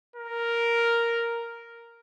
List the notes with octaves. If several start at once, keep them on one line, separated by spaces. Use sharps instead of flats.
A#4